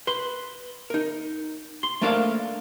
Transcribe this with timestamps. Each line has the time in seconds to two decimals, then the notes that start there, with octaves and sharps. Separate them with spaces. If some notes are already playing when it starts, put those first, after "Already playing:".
0.07 B4 C6
0.90 D#4 A#4
1.83 C6
2.02 A3 A#3 D4 A#4 C5 F5